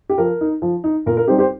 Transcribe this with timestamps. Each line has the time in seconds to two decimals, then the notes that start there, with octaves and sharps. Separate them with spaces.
0.10 G4
0.18 F3 A#4
0.41 D#4
0.62 F3
0.84 D#4
1.06 A#2 A#4
1.17 A#4
1.28 G3 C4 D#4 G4 C5
1.39 G4 C5